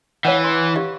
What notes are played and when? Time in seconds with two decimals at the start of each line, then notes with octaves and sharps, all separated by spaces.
0.25 E3 C#5 F5 F#5
0.44 C6
0.76 G4 F5